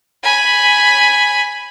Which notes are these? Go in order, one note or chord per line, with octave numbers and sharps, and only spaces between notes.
G#5 B5